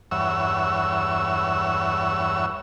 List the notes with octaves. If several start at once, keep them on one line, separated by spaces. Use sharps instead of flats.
E2 G2 C#5 E5 F#5 E6